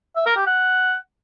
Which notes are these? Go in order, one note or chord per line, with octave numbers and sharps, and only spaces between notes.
E5
A#4
G4
F#5